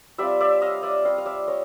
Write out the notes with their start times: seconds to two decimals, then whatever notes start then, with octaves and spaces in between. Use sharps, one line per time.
0.18 G3 C4 F4 D5 E5
0.40 D5 E5
0.62 D#5 F5
0.83 D5 E5
1.05 G3 C4 F4 D#5 F5
1.18 F5
1.26 D5 E5
1.48 C#5 D#5